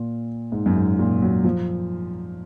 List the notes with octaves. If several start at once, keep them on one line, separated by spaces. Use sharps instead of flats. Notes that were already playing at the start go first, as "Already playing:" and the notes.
Already playing: A#2
G#2
F#2
G#2
A#2
F#3
F3